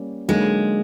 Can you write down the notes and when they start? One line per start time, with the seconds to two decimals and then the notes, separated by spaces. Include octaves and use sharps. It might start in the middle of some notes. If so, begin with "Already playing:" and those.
Already playing: G3 A#3 C#4
0.28 D3 F#3 G#3 A#3 D#4